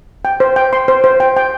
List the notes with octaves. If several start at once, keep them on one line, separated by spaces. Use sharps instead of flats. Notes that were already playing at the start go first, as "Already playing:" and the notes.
G5
C5
G5
C6
C5
C5
G5
G5